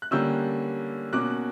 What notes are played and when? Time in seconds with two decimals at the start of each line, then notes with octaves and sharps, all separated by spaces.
0.02 F#6
0.11 D3 G3 A#3 C#4 E6 G6
1.13 B2 A#3 C#4 D6 F#6